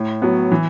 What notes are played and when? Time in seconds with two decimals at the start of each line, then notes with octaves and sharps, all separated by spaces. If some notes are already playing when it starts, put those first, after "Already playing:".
Already playing: A2
0.22 F#3 B3
0.52 E3